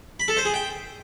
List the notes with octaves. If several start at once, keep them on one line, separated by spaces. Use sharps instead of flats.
B5
A4
C5
G#4
G5